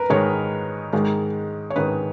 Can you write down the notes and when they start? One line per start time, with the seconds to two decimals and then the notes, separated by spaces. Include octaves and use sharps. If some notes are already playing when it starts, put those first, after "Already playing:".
Already playing: A#4 B4
0.10 G#2 D#3 G#3 C#5
0.93 G#2 D#3 G#3
1.70 C#5
1.76 G#2 D#3 G#3 B4